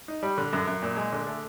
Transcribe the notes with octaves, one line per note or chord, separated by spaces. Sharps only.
D#4
G3
D3
F#2
F#2
A#2
G#3
D3
A3